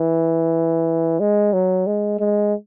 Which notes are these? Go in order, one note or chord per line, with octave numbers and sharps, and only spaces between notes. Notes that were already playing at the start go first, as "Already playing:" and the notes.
Already playing: E3
G#3
F#3
G#3
G#3